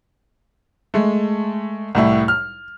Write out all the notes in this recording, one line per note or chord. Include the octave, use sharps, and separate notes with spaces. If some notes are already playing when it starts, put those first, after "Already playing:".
G#3 A3
C2 A2 E4
F6